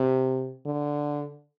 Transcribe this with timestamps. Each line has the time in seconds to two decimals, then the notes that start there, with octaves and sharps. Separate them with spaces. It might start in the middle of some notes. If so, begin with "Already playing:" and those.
Already playing: C3
0.66 D3